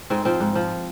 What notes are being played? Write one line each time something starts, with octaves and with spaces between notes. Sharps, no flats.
G#2 C4
F3 C4
G#2
F3